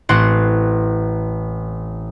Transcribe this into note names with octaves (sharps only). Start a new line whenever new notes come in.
A1 C4 C5 F#5